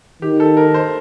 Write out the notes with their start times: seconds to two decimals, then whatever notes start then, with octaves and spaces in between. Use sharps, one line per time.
0.22 D#3 G4
0.40 A4
0.57 A#4
0.74 C5